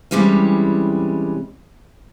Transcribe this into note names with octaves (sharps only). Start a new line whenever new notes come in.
C3 E3 G3 G#3 C#4